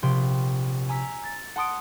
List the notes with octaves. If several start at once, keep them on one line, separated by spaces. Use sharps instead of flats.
A#1 C3 G5 C6
G#5 A#5 E6 B6
A6
F#5 A5 C6 D#6 D7